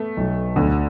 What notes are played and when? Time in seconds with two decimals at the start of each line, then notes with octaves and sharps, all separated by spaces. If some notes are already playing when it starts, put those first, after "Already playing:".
Already playing: A3 B3
0.17 B1
0.56 D2 D3